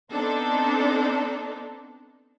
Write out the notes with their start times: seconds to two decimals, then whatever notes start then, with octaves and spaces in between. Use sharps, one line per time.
0.12 B3 C4 D4 D#4 A4